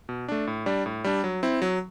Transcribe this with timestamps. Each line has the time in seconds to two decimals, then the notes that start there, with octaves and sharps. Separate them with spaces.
0.09 B2
0.28 A3 D4
0.47 A2
0.66 G3 D4
0.86 A2
1.04 G3 D4
1.24 F#3
1.43 C4 E4
1.62 F#3